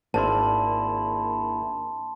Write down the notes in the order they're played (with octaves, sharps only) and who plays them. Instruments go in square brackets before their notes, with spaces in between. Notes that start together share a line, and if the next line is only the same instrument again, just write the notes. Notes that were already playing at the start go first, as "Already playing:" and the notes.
[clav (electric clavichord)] G#1 [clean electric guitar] A#3 D4 E4 [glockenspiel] A5 C6